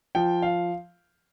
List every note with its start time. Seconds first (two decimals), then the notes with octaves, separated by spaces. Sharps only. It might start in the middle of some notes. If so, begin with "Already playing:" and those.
0.15 F3 G5
0.42 F5